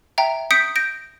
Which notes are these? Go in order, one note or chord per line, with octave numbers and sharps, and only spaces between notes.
E5 G5 A#5
D#6 G6 B6 C#7 D7
G6 A#6 D7